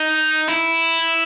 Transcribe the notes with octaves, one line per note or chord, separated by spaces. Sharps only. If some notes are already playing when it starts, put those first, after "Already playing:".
Already playing: D#4
E4